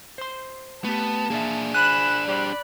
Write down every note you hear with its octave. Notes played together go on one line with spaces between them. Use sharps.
C5 C6
A3 B3 G4 A5
A#3 D4 G#4 D5 E5
C5 G#5 B5 F#6 E7
G3 G4 C5 D5 B5